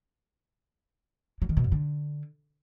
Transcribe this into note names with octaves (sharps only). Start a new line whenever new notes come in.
F#3
D#3
B2
F#2
D3